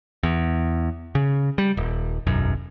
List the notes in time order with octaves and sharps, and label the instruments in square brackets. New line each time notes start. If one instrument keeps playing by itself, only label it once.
[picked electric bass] E2
C#3
G3
D#1
E1 B1 F#2